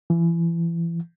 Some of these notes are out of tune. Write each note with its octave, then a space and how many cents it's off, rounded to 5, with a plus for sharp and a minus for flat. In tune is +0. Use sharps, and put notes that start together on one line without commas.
E3 +30